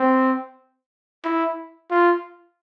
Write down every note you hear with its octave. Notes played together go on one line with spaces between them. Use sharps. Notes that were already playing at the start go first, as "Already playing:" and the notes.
Already playing: C4
E4
F4